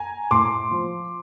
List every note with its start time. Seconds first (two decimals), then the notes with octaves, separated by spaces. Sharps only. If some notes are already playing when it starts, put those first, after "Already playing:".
Already playing: G#5 A#5
0.31 A2 C6 D6
0.71 F3